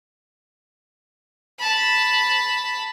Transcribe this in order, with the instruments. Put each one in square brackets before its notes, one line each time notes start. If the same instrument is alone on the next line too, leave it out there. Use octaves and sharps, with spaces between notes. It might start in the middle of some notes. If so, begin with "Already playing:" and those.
[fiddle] A5 B5